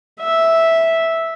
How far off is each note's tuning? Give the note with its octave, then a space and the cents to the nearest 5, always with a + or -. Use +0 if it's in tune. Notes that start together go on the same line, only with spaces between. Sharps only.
E5 -5